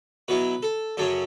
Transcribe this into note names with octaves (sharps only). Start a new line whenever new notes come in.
B2 F#3 B3 E4 B4
A4
F#2 C#3 F#3 C#4 A4